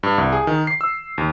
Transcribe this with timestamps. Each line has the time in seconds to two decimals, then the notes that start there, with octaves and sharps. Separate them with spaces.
0.03 G2
0.18 C2
0.32 G#4
0.47 D#3
0.67 C7
0.81 E6
1.18 D#2